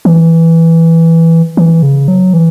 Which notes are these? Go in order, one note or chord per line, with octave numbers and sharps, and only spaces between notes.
E3
E3
C#3
F#3
E3